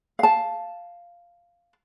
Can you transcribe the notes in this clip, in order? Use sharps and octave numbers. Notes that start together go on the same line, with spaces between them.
F5 A5